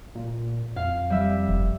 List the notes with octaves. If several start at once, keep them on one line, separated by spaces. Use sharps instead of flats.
A#2
F2 F5
G3 E5
F1